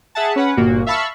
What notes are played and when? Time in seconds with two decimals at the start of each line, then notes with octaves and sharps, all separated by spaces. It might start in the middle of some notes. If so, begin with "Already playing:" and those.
0.15 G#4 E5 F#5 A5
0.36 C#4 B4 F#5
0.57 G1 A#2 A#3 F#4
0.86 E5 F5 A5 B5 C#6 E6